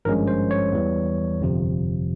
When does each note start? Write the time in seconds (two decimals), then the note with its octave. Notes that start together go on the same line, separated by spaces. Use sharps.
0.05 G#1 G2 F3 G#3 C#4 A#4
0.28 C5
0.51 C#5
0.72 E2 E3 G3
1.40 G1 F2 C3 F3